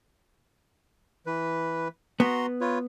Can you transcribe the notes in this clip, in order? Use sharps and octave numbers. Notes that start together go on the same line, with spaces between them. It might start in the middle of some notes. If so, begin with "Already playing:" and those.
E3 B4
B3 F#4 A#5 C6
F4 B4 C#5